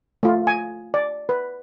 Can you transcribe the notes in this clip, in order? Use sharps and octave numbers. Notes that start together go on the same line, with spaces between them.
A3 F4
G#5
D5
B4